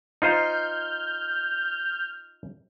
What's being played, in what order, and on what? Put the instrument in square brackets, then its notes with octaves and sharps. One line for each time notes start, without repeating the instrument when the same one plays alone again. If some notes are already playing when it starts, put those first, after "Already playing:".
[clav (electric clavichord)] D#4 F4 C5 [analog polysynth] F6 G6